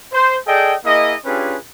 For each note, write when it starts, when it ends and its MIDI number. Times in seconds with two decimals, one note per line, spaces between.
0.13 0.36 72
0.47 0.75 68
0.47 0.75 69
0.47 0.75 74
0.47 0.75 75
0.47 0.75 79
0.85 1.15 58
0.85 1.15 64
0.85 1.15 68
0.85 1.15 75
1.25 1.56 61
1.25 1.56 62
1.25 1.56 65
1.25 1.56 67
1.25 1.56 68
1.25 1.56 71